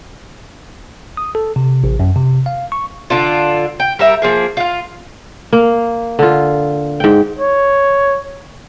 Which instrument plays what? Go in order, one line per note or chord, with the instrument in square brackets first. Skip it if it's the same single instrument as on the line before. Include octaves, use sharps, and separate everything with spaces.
[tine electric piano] D#6
A4
C3
A1
F#2
C3
F5
C#6
[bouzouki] D3 D4 F4
G5
G3 A#4 E5
F3 A#3 G#4
F4 F5
[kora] A#3
D3 F4
G#2 G5
[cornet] C#5